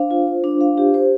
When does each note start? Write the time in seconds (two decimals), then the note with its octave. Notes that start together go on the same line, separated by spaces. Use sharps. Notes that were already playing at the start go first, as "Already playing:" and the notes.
Already playing: D4 C5 F5
0.11 F4
0.27 C5
0.44 D4
0.61 F5
0.78 G4
0.94 C5